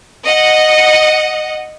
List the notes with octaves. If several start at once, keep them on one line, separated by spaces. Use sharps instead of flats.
D#5 F#5